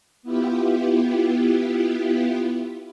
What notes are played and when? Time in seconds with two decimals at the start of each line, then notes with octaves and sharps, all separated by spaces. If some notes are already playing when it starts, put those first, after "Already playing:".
0.23 B3 E4 F4 G4